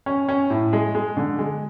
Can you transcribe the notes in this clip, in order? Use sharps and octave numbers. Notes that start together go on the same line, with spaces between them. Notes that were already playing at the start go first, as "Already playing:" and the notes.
C#4
C#4
A2
G#3
G#3
D3
G#3